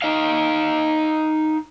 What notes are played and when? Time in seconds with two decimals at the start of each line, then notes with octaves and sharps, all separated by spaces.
0.02 D#4 D#5 F5